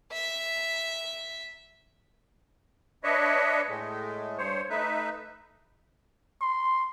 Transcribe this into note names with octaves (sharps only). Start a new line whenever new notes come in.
E5
D4 B4 C#5 D#5 E5
A2 G#3 A3
G2 C5 C#5
A3 D#4 B4 E5
C6